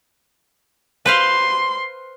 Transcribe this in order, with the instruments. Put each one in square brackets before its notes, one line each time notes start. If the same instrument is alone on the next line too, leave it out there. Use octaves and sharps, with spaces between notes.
[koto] B4 C5 F5 [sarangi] C6